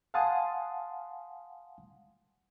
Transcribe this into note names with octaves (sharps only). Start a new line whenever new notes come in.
F5 F#5 G#5 A5 C6 D#6